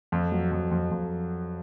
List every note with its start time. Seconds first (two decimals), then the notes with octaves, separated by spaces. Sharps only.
0.12 F2
0.32 F#3
0.52 F2
0.71 F2
0.91 F2